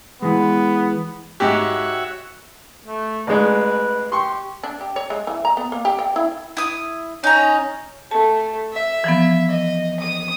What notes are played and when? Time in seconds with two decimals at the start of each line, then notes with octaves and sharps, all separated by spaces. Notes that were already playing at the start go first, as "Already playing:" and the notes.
0.22 E3 G#3 B3
1.40 G#2 F#4 G4 C#5 E5
2.85 A3
3.27 A1 G#3 B4
4.12 G4 C6 C#6
4.63 D4
4.81 G4
4.96 C#5
5.10 G#3
5.27 E3
5.45 A#5
5.57 B3
5.72 A#3
5.85 G4
5.99 G5
6.16 E4
6.57 E4 D#6
7.24 C#4 D#4 A#5
8.11 A3 A5
8.73 E5
9.04 E3 F3 B3
9.49 D#5
10.00 D#6